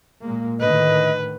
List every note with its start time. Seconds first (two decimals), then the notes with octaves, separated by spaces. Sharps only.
0.24 A#2 G#3 A#3
0.60 A2 D3 D#3 B4 D#5